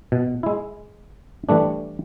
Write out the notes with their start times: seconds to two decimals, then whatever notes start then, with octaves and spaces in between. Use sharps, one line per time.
0.12 B2
0.43 G#3 E4
1.49 E3 G3 A3 D4